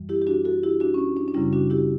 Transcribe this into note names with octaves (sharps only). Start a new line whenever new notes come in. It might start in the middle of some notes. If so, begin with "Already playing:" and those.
Already playing: F#2 E3 G3
E4 G4
G4
D4 F#4
F#4 A4
E4 G4
D4 F#4
C#4
D4
D4
D4
F#2 C#3 G3 C#4 E4
D4 F#4
E4 G4